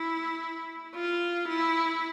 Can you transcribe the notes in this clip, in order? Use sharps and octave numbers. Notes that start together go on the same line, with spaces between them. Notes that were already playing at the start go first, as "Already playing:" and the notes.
Already playing: E4
F4
E4